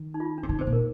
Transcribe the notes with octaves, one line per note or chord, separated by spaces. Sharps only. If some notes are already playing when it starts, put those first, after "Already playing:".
Already playing: D#3
D#4
F4
D#4
D4
C3
D3 D#4
C3 C5
A#2
A#4